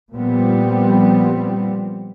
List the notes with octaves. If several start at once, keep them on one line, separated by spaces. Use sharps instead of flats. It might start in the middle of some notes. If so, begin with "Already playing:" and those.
A#2 F3 G3 B3 C4